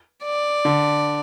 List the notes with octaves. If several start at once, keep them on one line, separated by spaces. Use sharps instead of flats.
D5
D3